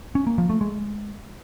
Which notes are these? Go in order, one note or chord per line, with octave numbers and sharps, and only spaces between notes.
C#4
A#3
F3
A3
G#3